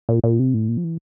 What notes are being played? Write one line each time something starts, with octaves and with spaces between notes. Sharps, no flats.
A#2
A#2
C3
A2
A#2
F3
E3